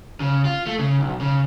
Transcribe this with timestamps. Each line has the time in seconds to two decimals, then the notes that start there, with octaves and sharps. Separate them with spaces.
0.20 C#3
0.45 F4
0.67 A3
0.79 C#3
1.00 B1
1.21 C#3